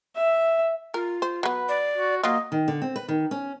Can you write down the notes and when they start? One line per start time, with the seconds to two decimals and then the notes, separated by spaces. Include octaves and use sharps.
0.17 E5
0.94 F4 A#4
1.22 C5
1.43 F#3 B3 B4
1.69 D5
1.98 F#4
2.23 F#3 A#3 F4 D#5
2.52 D#3
2.68 D3
2.82 C4
2.96 B4
3.08 D#3
3.31 C#4